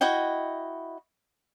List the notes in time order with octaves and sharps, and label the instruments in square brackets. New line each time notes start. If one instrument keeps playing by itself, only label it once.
[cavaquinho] E4 F#4 D#5 G5